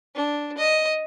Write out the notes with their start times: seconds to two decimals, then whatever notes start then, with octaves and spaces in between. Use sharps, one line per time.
0.15 D4
0.58 D#5